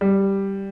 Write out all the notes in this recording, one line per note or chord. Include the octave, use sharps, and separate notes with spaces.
G3